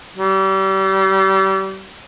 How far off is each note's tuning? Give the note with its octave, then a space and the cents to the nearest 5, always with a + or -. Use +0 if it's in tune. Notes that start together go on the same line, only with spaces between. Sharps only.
G3 -35